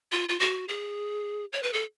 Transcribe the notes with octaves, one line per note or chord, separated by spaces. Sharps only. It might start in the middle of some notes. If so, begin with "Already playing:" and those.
F4
F4
F#4
G#4
C#5
B4
A4